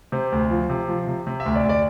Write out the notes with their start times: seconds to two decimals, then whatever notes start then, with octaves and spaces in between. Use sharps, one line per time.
0.12 C3 C5
0.32 D2
0.51 F3
0.70 C3
0.88 F3
1.07 C3
1.27 C3
1.40 E5
1.46 D2
1.55 D5
1.64 D2
1.69 D5